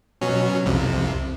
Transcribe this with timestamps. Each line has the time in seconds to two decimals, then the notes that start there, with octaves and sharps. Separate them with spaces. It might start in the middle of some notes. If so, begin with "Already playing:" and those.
0.21 B2 F#3 C#4
0.66 C2 F2 C3